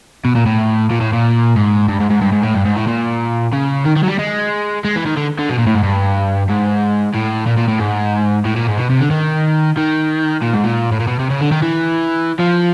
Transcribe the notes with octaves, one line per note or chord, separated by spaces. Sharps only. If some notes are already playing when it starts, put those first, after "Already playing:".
B2
A#2
A2
A#2
A2
A#2
G#2
G2
G#2
G#2
G2
G#2
A2
G2
G#2
A2
A#2
C#3
D#3
D#3
F#3
G3
G#3
G#3
E3
D#3
D3
D3
B2
A#2
A2
G#2
G2
G#2
A2
A#2
A#2
A2
G#2
A2
A#2
G#2
B2
C3
D3
D#3
D#3
A#2
G#2
A#2
A2
A#2
B2
C3
C#3
D3
D#3
E3
F3